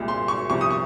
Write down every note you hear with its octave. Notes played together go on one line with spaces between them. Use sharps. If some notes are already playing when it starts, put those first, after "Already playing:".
Already playing: C2 A#2 G#3
C6
C#6
C2 C3 F3 C#6
D#6
C#6